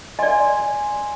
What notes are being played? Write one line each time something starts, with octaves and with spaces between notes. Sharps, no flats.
D5 D#5 G#5 C6